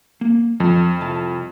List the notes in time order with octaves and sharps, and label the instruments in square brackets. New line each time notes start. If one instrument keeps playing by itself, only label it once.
[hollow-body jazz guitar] A#3
[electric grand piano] F2 [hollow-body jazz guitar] F3
[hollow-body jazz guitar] C2 A5